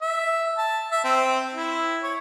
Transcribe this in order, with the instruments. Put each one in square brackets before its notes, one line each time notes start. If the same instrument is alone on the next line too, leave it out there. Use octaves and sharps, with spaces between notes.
[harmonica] E5
A5
E5
C4
E4
C#5